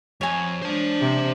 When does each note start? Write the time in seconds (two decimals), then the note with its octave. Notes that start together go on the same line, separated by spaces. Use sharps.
0.21 F2 C#5 G#5
0.62 G#3 D4 C5 A5
1.01 C3